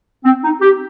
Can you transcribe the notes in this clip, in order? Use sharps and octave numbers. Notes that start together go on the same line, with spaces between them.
C4
D#4
G4